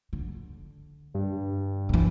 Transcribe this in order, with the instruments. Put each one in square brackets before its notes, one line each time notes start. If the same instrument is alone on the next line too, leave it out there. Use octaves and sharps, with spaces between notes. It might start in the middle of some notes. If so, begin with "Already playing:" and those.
[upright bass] D3
[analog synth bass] G2
[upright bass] A#2 E3